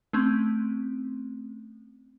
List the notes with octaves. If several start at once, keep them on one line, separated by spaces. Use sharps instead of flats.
A3 C4 C#4